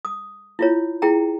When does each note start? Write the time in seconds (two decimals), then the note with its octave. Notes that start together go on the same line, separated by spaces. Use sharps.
0.05 D#6
0.59 E4 F4 C#5
1.02 E4 G#4 G5 A#5